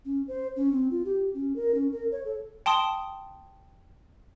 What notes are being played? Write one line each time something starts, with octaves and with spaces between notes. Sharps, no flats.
C#4
C5
C#4
C4
F4
G4
C#4
A#4
C#4
A#4
C#5
A4
G5 A5 C6 D#6